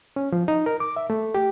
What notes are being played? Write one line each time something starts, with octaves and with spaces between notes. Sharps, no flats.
C#4
F3
D#4
A#4
D6
E5
A3
G4